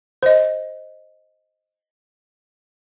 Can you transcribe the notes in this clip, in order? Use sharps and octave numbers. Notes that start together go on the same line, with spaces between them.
C5 D#5